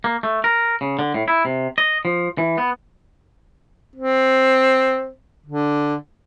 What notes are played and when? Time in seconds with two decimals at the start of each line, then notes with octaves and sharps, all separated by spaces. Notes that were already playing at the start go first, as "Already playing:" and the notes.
0.04 A#3
0.23 A3
0.44 A#4
0.81 C#3
0.99 D3
1.14 A2
1.28 E4
1.45 C3
1.78 D#5
2.05 F3
2.38 E3
2.58 B3
3.96 C4
5.46 D3